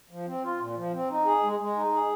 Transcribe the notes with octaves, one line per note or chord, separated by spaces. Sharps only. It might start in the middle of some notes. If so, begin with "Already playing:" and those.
F3
C4
F4
A#2
F3
C4
D#4
G#4
G#3
G#3
D#4
G#4